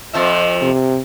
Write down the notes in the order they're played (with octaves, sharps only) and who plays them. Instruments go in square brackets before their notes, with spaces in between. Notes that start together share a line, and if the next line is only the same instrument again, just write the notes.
[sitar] F2 F3 E5
[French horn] C3